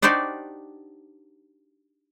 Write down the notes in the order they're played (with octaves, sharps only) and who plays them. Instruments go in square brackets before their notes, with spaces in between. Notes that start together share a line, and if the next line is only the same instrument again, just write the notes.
[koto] D4 D#4 F#4 G4 C5 D5